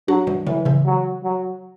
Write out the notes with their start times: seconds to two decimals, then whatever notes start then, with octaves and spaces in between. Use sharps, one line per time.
0.08 F#3 D4 F#4
0.27 E3 G3
0.46 D3 E3 F#3
0.65 C#3 E3
0.85 F#3
1.23 F#3